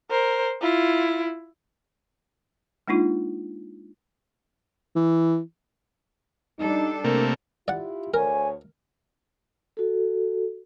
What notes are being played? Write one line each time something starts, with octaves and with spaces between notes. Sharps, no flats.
A#4 C5
E4 F4
G#3 A#3 D4 D#4 F4
E3
G3 D4 D#4 A4
C3 A3 A#3 A#4
E4 F4 G4 D5 F#5
D2 A#4 C#5 G#5
F#4 A4